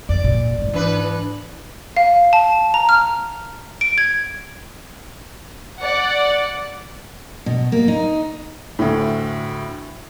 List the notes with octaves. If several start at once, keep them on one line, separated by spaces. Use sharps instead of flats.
F2 D5
A#2
G#2 G#3
E3 D4 B4
F5
A5
A#5
F6
D7
G#6
D5 F#5
B2
A#3
D#4
D2 A2